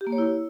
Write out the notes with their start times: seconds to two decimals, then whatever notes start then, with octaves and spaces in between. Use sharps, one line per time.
0.01 G4
0.07 A#3
0.12 C#5
0.18 E4